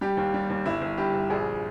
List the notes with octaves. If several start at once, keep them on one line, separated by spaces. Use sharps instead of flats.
G3 G4
D#2
G3
D#2
G1 E4
G1
G2 G4
G1
A#1 G#4